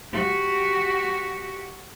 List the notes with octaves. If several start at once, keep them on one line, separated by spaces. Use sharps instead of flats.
F#4 G4